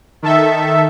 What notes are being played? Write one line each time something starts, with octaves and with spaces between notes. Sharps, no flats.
D#3 A4 E5